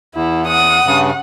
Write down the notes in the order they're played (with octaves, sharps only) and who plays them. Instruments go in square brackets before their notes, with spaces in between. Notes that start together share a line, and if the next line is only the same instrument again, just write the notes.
[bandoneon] E2 [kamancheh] E4
[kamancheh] F#5 [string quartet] D#6
[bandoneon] G2 C#3